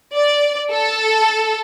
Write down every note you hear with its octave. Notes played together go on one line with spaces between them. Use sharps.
D5
A4